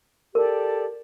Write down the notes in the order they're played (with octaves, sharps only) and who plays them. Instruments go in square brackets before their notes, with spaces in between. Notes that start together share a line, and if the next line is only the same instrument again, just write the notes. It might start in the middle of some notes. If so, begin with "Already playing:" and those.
[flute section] G4 A4 D5 [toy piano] A#4